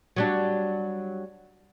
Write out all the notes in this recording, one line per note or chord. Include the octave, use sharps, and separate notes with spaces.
F#3 G3 D4